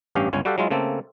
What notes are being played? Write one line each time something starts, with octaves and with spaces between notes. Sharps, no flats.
A1 G2 C#4 G4 F5
G1 C#2 C#4 G#5
G3 F#4 G4 A4 F5 F#5
F#3 G#3 E4 F4
C#3 A3 A#3 C4 A4